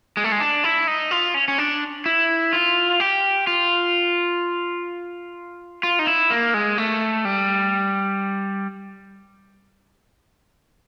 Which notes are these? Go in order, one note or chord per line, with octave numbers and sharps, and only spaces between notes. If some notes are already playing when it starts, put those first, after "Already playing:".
G#3
A3
G#3
D4
E4
D#4
F4
C#4
C#4
D4
E4
F4
G4
F4
F4
D#4
E4
A#3
G#3
A3
G3